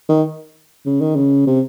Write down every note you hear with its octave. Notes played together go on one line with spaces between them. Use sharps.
D#3
C#3
D#3
C#3
C3